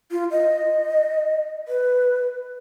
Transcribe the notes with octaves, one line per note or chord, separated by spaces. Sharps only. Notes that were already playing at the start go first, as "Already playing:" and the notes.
F4
D#5
B4